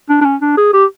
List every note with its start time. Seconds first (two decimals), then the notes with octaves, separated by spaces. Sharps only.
0.09 D4
0.21 D4
0.25 C#4
0.42 D4
0.57 G#4
0.73 G4